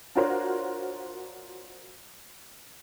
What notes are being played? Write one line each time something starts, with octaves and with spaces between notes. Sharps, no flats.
D4 F4 F#4 A#4 C5 C#5